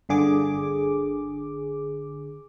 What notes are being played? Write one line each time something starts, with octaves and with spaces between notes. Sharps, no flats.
G1 D3 G#4 D6